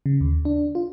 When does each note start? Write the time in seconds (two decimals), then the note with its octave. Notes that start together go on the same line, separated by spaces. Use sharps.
0.06 C#3
0.21 D#2
0.45 D4
0.75 F4